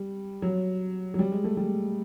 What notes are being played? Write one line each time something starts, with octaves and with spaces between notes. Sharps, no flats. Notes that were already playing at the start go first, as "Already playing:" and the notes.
Already playing: G3
F#3
F#3
G3
G#3
A3
G3